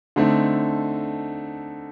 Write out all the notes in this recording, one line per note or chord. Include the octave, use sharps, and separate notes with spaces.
D3 A3 C4 D#4